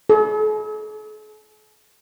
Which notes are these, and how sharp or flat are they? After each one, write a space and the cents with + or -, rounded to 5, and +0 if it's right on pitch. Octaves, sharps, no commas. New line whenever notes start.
A4 -45